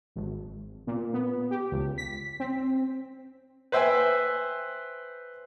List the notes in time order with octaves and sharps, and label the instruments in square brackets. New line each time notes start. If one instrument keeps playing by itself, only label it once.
[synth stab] G#1
A#2
B3
G4
C#2
B6
C4
[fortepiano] B4 C5 E5 G5 G#5